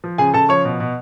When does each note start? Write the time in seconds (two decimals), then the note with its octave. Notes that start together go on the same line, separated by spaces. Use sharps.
0.04 F3
0.18 C#3 G#4 G#5
0.34 C#3 A4 A5
0.49 F3 C#5 C#6
0.65 B2
0.80 B2